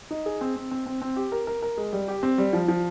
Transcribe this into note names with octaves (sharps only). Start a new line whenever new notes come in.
D#4
G#4
C4
C4
C4
C4
C4
G4
A#4
A#4
A#4
G#3
G3
G4
C4
G3
F3
F3